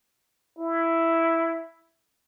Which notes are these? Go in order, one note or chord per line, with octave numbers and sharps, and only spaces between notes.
E4